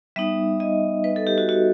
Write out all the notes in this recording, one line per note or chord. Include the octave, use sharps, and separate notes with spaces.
G3 B3 D#4 E5
D#5
B4
A4
G4
F#4
F#4